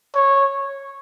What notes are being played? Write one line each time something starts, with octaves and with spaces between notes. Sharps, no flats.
C#5